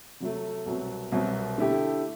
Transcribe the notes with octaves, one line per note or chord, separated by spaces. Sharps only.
C3 F#3 A3
C2 B2 F#3 C4
C2 B2 F#3 C4
D3 A3 E4 G4